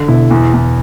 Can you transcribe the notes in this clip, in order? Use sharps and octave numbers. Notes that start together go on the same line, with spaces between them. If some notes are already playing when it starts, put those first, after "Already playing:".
Already playing: D3
B2 E4
E2
E2